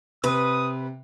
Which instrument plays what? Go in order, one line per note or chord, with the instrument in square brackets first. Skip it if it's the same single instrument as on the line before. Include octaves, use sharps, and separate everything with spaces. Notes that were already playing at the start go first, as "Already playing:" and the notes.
[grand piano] C3 [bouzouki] B4 [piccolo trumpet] D#6